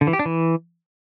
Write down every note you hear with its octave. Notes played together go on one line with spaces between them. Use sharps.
D3
E3
G4
D4
E3